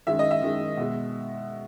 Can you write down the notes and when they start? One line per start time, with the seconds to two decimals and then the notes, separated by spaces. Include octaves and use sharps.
0.07 F#2 D#3 G#3 E5
0.19 D#5
0.31 E5
0.42 F#2 D#3 G#3
0.77 B2 G#3